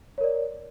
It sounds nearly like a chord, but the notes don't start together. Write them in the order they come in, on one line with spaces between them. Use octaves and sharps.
C#5 A#4 D5